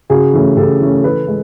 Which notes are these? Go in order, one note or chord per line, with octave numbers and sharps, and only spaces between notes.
C#3 F#4 G#4
E3 A3 C#4
C#3 G4 A4
E3 A3 C#4
E3 A4 B4
G#3